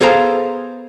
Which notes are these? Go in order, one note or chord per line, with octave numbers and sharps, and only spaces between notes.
B3 G#4 A4 C5 F5 A#5